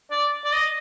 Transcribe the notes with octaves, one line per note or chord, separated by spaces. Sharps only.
D5
D5
D#5